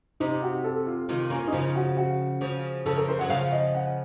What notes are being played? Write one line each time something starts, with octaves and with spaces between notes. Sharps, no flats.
C3 D#4
F#4
A4
F4
C3 D#3 F4
A#3 C#4 F4
D#4
C#3 F3 F4
F#4
F#4
C#3 F3
C#3 F3 A4
A#4
C5
F#3 F#5
C#3 F3 F5
D#5
F#5